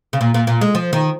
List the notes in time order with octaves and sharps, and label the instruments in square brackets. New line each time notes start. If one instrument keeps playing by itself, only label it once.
[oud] C#3
A#2
A#2
A#2
G#3
F3
D#3